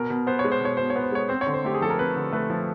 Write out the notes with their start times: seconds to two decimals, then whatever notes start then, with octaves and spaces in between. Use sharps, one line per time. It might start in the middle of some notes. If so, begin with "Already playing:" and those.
Already playing: B2 A#4
0.10 B2
0.27 B3 C5
0.39 C#5
0.45 G#3
0.52 C5
0.60 B2 C#5
0.77 B2 C5
0.90 C#5
0.96 B3
1.03 C5
1.12 G#3 C#5
1.29 C4 C5
1.41 C#5
1.47 D3
1.53 C5
1.64 A3 G4
1.74 G#4
1.81 F3 A4
1.90 A#4
1.99 C4 B4
2.16 D3
2.32 A3 B4
2.50 F3